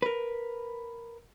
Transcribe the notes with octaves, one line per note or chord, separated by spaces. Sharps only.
A#4 B4